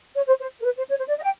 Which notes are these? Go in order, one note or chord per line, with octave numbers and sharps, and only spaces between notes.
C#5
C5
C5
A#4
B4
C5
C#5
C5
D5
D#5
G5